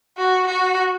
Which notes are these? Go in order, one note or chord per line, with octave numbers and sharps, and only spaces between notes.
F#4
F#4